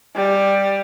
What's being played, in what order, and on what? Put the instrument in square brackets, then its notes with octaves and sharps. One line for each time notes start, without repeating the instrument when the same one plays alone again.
[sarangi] G3